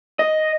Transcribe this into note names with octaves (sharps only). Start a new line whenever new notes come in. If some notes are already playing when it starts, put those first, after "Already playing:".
D#5